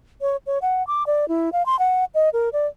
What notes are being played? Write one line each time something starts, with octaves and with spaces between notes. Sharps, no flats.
C#5
C#5
F#5
D6
D5
E4
F5
C6
F#5
D#5
A#4
D5